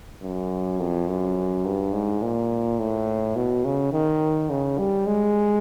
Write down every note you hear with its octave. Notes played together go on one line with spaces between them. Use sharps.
F#2
F2
F#2
G2
G#2
A#2
A2
B2
C#3
D#3
C#3
G3
G#3